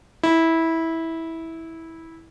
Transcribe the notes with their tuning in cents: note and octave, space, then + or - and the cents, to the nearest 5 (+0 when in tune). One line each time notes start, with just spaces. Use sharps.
E4 -15